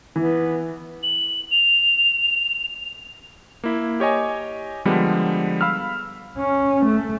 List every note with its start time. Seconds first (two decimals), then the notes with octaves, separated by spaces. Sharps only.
0.16 E3 B3
1.03 F#7
1.51 F7
3.64 A#3 E4
4.00 G4 C#5 D#5 G#5
4.85 D3 F3 G3 G#3 B3
5.61 F5 B5 E6 F6
6.38 C#4
6.86 A3